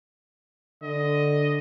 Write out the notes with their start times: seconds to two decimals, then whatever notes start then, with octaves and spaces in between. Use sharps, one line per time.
0.83 D3 D#5